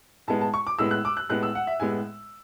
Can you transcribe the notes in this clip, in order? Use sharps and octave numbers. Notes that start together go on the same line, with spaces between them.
A2 G#3 B3 A5
A5
C#6
D6
A2 G#3 B3 E6
F#6
D6
F#6
A2 G#3 B3 F#6
E6
F#5
E5
A2 G#3 B3 G#5